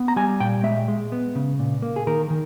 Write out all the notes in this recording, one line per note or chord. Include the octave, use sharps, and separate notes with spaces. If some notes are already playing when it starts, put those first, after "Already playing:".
Already playing: B3
A#5
G3 G#5
A#2 G5
G#3 E5
G#3
B3
C#3
A#2
A#3
G#4
D#3 A#4
D#3